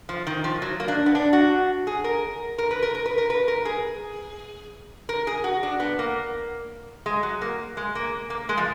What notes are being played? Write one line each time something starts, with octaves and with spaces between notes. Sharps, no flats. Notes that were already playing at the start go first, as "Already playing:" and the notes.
F3
D#3
F3
F#3
A#3
D4
B3
D4
F#4
G#4
A#4
A#4
B4
A#4
A#4
B4
A#4
B4
A#4
G#4
A#4
G#4
F#4
D4
B3
A#3
G#3
F#3
A#3
G#3
A#3
A#3
G#3
F3